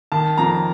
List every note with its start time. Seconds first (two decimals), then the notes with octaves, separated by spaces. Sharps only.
0.12 D#3 A5
0.37 F2 A#5